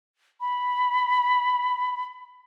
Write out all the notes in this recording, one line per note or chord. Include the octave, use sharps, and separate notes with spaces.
B5